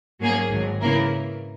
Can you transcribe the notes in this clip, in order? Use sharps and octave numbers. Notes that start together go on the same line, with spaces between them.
G#2 F#3 A#3 C#4 G#4
G#1 G#2 F#3
C#3 E3 A#3 E4 A#4